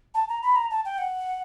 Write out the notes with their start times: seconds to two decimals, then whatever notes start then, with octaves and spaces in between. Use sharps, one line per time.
0.15 A5
0.29 A#5
0.43 B5
0.56 A#5
0.71 A5
0.85 G5
0.98 F#5